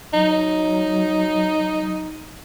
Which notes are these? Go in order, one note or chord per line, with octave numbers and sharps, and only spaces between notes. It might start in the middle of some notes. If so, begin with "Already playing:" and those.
F#3 D#4